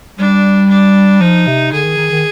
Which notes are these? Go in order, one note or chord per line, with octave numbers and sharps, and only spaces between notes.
G3 D4
D4
F3 D#4
C3
D3 G#4
D#3
D#3
D#3